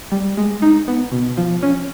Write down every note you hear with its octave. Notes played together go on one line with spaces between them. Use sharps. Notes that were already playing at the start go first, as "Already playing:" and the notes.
G3
G#3
D#4
B3
B2
F3
C#4